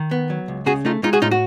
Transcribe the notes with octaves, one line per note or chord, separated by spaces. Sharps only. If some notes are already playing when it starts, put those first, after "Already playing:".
Already playing: D#3
B3
F#3
C#2
C#3 F#4 G#4
A3 D#4 F4
G#3 D#4 F4
F#4 G#4
A2 D#4 F4
F#4